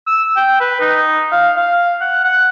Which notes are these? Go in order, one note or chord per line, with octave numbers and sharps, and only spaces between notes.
E6
G5
B4
D#4
F5
F5
F#5
F#5